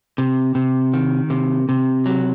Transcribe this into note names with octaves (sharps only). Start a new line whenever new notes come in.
C3
C3
D#3
C3
C3
F#3